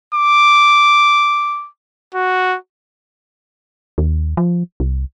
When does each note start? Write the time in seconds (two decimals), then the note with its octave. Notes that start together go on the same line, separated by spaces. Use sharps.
0.15 D6
2.15 F#4
3.98 D#2
4.37 F3
4.80 C2